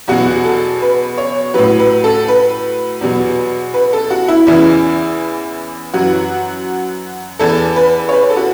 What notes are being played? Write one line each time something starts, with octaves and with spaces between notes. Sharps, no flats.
E2 B2 F#3 F#4
A4
B4
C#5
A2 F#3 B4
B4
A4
B4
E2 B2 F#3
B4
A4
F#4
E4
E2 C#3 E3 E4
F#2 E3 F#4
E2 E3 A4
B4
C#5
B4
A4
F#4